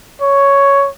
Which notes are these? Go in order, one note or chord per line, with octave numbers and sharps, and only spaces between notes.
C#5